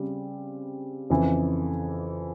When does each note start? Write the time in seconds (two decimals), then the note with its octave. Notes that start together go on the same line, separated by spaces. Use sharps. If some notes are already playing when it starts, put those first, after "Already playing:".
Already playing: C#3 G3 C4
1.10 F2 C#3 E3